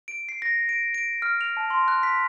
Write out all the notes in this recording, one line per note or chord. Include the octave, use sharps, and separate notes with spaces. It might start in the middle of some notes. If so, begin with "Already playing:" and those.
D7
C7
A#6
D7
D7
F6
F7
A5
C6
F#6
B6